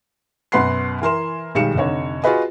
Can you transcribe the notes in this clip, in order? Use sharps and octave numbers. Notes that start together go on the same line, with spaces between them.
F#2 B2 B4 F#5 C6 C7
E3 A#4 C6 E7
B1 D#3 G3 G#3 C#7 E7
F1 D3 D#4 C#5
F4 F#4 G#4 B4 D#5